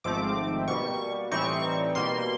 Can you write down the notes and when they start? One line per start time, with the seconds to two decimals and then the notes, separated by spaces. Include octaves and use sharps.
0.04 G#1 G#2 F3 A3 C4 D6
0.68 B2 G3 A#3 C#6
1.31 A2 E3 G3 C4 D#4 C#6
1.95 B2 G3 A#3 C6